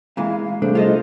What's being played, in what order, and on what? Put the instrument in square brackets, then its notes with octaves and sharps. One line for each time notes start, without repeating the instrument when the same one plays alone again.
[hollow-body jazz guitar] A#2 E3 G#3 [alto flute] F5
[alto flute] F5
[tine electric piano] C3 G3 G#4 [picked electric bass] A3 [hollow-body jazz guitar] D4 [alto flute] C5
[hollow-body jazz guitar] F4 A4 D#5